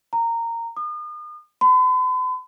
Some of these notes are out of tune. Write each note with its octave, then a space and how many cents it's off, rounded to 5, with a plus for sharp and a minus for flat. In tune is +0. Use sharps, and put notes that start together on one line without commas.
A#5 -15
D#6 -40
B5 +45